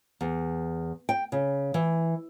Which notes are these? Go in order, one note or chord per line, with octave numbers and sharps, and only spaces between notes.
E2
G5
C#3
E3